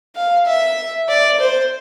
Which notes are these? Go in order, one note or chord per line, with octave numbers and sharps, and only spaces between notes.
F5
E5
D5
C5